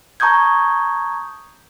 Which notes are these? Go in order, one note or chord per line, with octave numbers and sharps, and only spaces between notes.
A5 A#5 C#6 D#6 G6 G#6